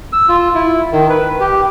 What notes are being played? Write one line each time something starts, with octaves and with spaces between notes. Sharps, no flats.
E6
F4
E4
D#3
B4
G4